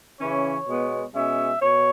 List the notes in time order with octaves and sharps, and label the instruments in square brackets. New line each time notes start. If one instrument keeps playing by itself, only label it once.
[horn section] C#3 E3 C#4 C#5
B2 G#3 B3
B2 G#3 C#4 E5
B2 C#5